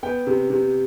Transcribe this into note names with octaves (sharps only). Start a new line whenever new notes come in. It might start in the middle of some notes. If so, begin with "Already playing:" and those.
B3 G5
C3
C3